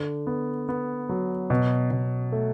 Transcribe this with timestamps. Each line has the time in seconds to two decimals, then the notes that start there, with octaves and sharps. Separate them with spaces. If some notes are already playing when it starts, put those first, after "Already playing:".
Already playing: D3
0.27 B3
0.69 B3
1.09 F#3
1.50 B2
1.91 B2
2.32 A3